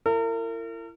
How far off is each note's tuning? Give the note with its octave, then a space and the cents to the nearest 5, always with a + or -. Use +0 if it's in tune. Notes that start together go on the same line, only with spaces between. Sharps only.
E4 +35 A#4 -40